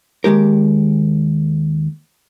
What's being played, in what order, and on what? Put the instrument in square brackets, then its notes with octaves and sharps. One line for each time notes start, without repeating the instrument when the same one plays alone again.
[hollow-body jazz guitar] D#2 C3 G#3 G4 A#4